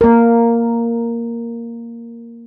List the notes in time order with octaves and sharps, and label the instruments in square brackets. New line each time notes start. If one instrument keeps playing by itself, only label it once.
[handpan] A#3 A#4